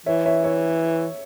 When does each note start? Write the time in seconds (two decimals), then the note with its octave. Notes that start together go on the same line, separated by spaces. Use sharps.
0.06 E3 C#5 E5
0.25 C#5 E5
0.44 C#5 E5